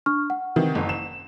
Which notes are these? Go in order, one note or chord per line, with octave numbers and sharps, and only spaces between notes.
D4 C#6 F6
F#5
C3 D#3 E3
F#1
E7